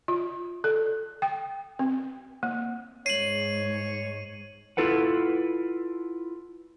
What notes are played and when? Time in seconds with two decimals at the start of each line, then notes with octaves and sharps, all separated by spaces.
0.08 F4
0.64 A4
1.22 G5
1.79 C4
2.43 A#3
3.06 G#2 C#5 C7 D#7 F#7
4.77 E4 F4 A4 B4 F#5